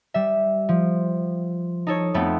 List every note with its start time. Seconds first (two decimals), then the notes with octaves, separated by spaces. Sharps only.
0.14 G3 E5
0.69 F3
1.87 D#4 A4 C#5
2.14 F2 A3 B3 C4